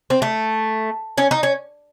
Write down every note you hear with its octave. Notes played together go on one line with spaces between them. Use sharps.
C4
A3
C#4
D#4
C#4